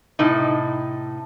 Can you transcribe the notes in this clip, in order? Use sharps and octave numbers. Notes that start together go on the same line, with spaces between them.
A2 C3 D#4